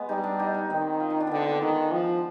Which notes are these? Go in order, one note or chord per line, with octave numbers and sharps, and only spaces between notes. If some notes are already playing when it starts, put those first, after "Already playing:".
Already playing: G#3 B3
G3 D#4
D4
D#4
D#4
D#3 C4
F4
D#4
D4
D3 B3 C4
B3
D#3 G#3
F3